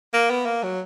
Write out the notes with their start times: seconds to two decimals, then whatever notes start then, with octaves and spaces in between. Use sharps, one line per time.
0.13 A#3
0.30 B3
0.46 A#3
0.63 F#3